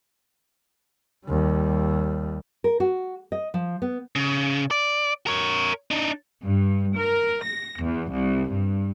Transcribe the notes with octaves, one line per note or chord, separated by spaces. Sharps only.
D#2 G3
A#4
F#4
D#5
F3
B3
C#3
D5
A#4 C#5
D4 D#4
G2
A#4
A#6
E2
C2
G2